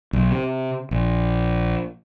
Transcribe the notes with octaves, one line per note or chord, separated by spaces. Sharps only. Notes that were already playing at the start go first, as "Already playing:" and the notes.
B1
C3
A#1